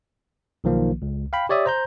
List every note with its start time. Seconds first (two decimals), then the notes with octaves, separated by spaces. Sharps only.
0.64 B1 D#3 F3 A#3
1.02 C#2
1.33 F5 G5 B5
1.49 G4 C#5 D5 E5 D#6
1.66 C5 A#5 G6